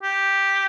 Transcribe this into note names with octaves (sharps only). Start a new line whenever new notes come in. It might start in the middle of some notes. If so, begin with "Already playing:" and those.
G4